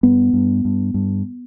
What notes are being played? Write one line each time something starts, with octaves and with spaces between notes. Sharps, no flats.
G2 B3
G2
G2
G2